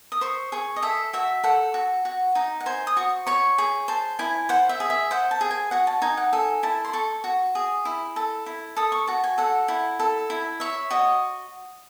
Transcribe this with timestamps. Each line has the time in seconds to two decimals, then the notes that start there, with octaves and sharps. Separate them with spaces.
0.12 D#6
0.21 C5 C#6
0.52 G#4 C#6
0.76 D#5
0.82 A4 E5
1.13 F#4 E5
1.44 A4 F#5
1.74 F#4
2.05 F#4
2.35 D#4
2.60 F#5
2.66 C5 G#5
2.87 D#6
2.97 F#4 C#6
3.27 C#5 C#6
3.58 G#4
3.88 C5 A5
4.19 E4 G#5
4.49 C5 F#5
4.69 E5
4.80 G#4
4.90 E5
5.11 C5 F#5
5.31 A5
5.41 G#4
5.51 G#5
5.71 F#4 F#5
5.87 A5
6.02 D#4 G#5
6.17 F#5
6.33 A4 G#5
6.63 E4 A5
6.85 C6
6.93 A4 C#6
7.24 F#4
7.55 G#4
7.85 E4
8.16 A4
8.46 E4
8.76 A4 D#6
8.92 C#6
9.07 F#4 A5
9.24 G#5
9.38 A4 F#5
9.68 E4
10.00 A4
10.30 E4
10.60 C#5 E5
10.90 F#4 D#5